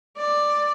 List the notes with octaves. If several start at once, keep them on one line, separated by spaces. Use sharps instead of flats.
D5